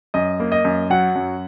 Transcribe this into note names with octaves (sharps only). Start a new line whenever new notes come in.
F#2 D#5
A#3
D#5
F#2
F#3 F#5
F#2